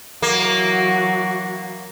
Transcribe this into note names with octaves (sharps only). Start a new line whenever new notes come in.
E3 F#3 A#3 F#4